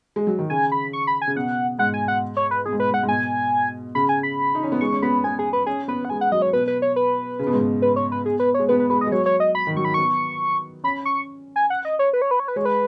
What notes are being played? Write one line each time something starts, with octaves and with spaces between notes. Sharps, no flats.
G#3
F#3
D#3
C#3 G#5
B5
C#6
B5
G#5
C#3
B2 F#5
G#2 F#5
G#5
F#5
C#5
B4
B2 G#4
G#2
B4
G#2 F#5
G#2
B2 G#5
C#3 B5
G#5
B5
D#4
C#4
B3
G#3 C#6
C#4
B3 B5
B3 G#5
G#4
B4
C#4 G#4
B3 B4
F#5
G#3 G#5
F#5
F#3 D#5
C#5
B2 B4
B4
C#5
B4
C#3
B2
G#2
B2
B4
C#5
B4
G#4
B4
G#3 C#5
B3 B4
B4
G#3 B4
D#5
G#3
F#3 C#5
C#5
D#5
B5
D#3
F#3 C#6
B5
B3 C#6
C#4 B5
C#6
G#5
F#5
D#5
C#5
B4
C#5
B4
C#5
B4
G#3 C#5
B4